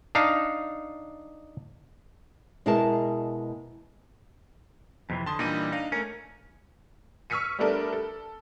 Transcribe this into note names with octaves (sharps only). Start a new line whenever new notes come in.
D4 D#4 F5
B2 G#3 E4 G#4 A#4 A5
F2 C3 E3
D3 A5 C6 D#6
A#2 E3 G3 D4 D#4 D#7
D4 D#4 F5
A3 C#4 A#4
C#6 E6 F6 B6 C#7 D#7
G3 A3 B3 D4 A4 A#4
A4